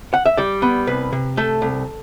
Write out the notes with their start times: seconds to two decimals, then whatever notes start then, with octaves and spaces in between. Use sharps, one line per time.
0.14 F#5
0.25 E5
0.37 G3 D5
0.62 B3
0.87 C2 B4
1.12 C3
1.37 A3 A4
1.62 C2